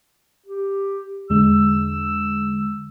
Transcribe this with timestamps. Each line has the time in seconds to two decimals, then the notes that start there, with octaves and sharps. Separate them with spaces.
0.46 G4
1.30 E2 D3 G#3 E6